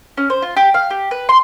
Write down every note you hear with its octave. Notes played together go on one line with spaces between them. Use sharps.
C#4
C5
F4
G4
F5
G4
B4
C6